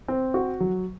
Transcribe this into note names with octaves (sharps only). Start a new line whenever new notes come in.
C4
F#4
F#3